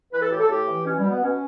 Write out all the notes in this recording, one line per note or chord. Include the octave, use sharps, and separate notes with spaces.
E3 B4
A4
A2 G4
A4
A2 G4
E3
B2 C#4
G3
B2
B3
B2 C#4